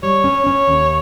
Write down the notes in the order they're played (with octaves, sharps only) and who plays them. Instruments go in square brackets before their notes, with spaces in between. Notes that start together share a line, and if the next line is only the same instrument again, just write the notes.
[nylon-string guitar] G3 [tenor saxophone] C#5
[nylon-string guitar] C#4
C#4
D#2